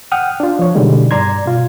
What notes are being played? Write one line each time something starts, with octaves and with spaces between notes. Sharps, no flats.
F#5 G5 D#6 F6
D4 F4
F3 C#5
B2 D3 E3 G3 G#3 D#4
G2 D5 A#5 C6 G#6
B2 F4